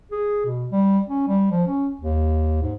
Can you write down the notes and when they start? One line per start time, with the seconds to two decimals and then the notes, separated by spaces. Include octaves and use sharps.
0.12 G#4
0.45 B2
0.72 G3
1.09 C#4
1.28 G3
1.51 F3
1.67 C#4
2.01 D#2
2.62 G#2